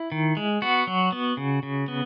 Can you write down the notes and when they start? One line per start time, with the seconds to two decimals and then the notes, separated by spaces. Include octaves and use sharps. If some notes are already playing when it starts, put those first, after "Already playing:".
Already playing: E4
0.12 D#3
0.37 G#3
0.62 B3 F#4
0.87 F#3
1.12 B3
1.37 C#3
1.63 C#3
1.88 B3